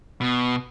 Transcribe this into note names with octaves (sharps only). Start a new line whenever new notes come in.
B2